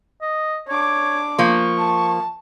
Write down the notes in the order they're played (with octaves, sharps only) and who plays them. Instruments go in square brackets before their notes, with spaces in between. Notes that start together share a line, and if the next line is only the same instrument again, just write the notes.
[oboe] D#5
[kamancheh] D4 D6 [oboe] C#5
[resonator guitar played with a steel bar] F3 A#3 [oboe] C#6
[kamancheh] A5